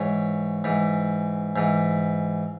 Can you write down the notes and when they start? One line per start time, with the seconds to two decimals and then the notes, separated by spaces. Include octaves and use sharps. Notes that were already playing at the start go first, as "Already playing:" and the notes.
Already playing: G#2 E3 C#5
0.64 G#2 E3
1.56 G#2 E3